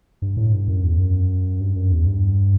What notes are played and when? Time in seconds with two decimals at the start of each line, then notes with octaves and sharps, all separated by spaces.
0.22 G2
0.37 A2
0.53 G2
0.68 F#2
0.84 E2
0.99 F#2
1.60 G2
1.76 F#2
1.92 E2
2.07 G2